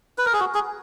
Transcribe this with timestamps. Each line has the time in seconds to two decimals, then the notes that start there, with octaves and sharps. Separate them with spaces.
0.18 B4
0.25 A#4
0.33 G#4
0.40 F#4
0.54 G#4